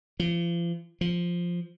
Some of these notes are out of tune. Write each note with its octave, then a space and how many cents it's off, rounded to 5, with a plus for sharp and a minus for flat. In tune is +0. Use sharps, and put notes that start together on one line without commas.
F3 -40
F3 +0